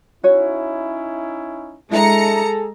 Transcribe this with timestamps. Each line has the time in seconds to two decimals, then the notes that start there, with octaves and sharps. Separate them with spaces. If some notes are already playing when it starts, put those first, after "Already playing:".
0.24 C#4 D#4 E4 F#4 C#5
1.91 G#3 D4 E4 G#4 A4 A#5 C#7